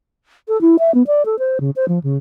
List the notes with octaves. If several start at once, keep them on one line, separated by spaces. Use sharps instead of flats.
A4
E4
E5
B3
D5
A4
C5
C#3
C5
F3
C#3